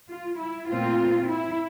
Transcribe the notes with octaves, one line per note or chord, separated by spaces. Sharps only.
F4
E4
A#2 A3 C4 F4
E4